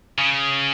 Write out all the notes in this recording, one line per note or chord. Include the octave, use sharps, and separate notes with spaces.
C#3